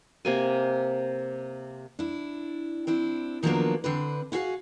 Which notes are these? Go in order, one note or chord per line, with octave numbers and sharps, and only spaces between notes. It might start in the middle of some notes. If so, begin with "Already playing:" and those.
C3 A#3 G#5
D4 E4
C4 D4 E4
D#3 F3 F#3 A#3 B3 D4
D3 C4 D4 B4
E4 F#4 G#4 A4 F5 F#5